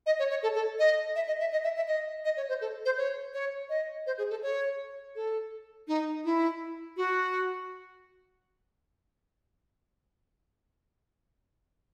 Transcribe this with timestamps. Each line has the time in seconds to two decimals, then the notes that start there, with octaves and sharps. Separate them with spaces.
0.06 D#5
0.19 C#5
0.30 C#5
0.43 A4
0.55 A4
0.79 D#5
1.16 E5
1.27 D#5
1.40 E5
1.52 D#5
1.64 E5
1.76 E5
1.88 D#5
2.25 D#5
2.37 C#5
2.49 C5
2.61 A4
2.85 C5
2.98 C#5
3.34 C#5
3.70 D#5
4.07 C5
4.18 G#4
4.30 A4
4.43 C#5
5.16 A4
5.88 D#4
6.25 E4
6.97 F#4